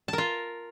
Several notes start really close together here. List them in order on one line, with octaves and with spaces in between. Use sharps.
A5 A#4 F4